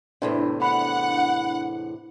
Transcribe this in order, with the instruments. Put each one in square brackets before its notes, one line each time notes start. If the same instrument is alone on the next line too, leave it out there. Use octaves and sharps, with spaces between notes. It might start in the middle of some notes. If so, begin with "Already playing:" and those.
[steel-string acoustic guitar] E2 A2 C3 [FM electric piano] D4 E4
[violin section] F#5 [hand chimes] B5